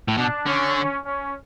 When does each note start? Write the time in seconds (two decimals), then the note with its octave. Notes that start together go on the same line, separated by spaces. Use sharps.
0.08 A2
0.17 B2 D4
0.46 D3 C#4
1.03 C#4